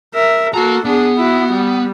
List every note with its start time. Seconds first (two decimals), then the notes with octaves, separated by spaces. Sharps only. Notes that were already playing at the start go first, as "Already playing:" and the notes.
0.14 A#4 E5
0.54 A#3 F#4 A4 A#5
0.85 B3 D4 G#4
1.17 E4 F#4
1.52 G3